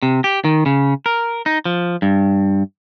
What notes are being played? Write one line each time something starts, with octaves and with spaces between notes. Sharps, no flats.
C3
G4
D#3
C#3
A#4
D#4
F3
G2